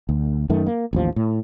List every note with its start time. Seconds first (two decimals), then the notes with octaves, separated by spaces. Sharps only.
0.09 D2
0.50 F#2 D#3 A3
0.66 A#3
0.93 A1 D#2 F3
1.16 A2